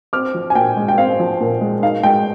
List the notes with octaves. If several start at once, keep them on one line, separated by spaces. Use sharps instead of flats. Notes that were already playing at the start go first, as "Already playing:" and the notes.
C4 D6 F6
F3
G#5
A#2 G5
G#3
G5
C4 F5
F3
A#2
G#3
D#4 F5
G#3 G5